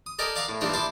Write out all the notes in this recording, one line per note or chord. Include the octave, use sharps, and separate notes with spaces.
D#6
A4 A#4 D5 D#5 G5 G#5
D5 F5 F#5 A#5 C#6
A2
G2 A#2 E3 D4 D#4 C5
D4 E4 C5 D6